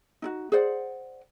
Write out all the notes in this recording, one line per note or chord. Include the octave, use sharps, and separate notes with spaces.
D#4 E4 F#4
G#4 C5 D5 F#5